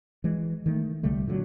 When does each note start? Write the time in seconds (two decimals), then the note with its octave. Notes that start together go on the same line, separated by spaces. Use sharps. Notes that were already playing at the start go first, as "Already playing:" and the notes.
0.24 E3 G#3
0.66 D#3 G#3 A3
1.03 C2 D3 G3 A3
1.27 A#2 D3 F3 F#3